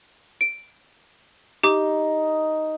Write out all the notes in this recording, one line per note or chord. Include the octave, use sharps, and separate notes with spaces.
D7
D#4 G4 D6